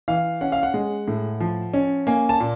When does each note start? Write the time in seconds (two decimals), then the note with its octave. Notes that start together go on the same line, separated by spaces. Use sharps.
0.08 E3 F5
0.41 C#4 F#5
0.52 F5
0.63 F#5
0.74 G#3
1.08 A2
1.40 F3
1.74 C#4
2.07 A#3 G#5
2.29 A5
2.40 A#2